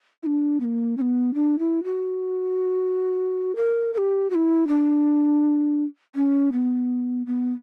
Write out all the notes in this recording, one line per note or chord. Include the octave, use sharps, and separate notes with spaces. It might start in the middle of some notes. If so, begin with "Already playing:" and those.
E4
D4
B3
A#3
C#4
B3
D4
E4
F#4
A#4
A#4
G4
F#4
E4
D4
C#4
B3
B3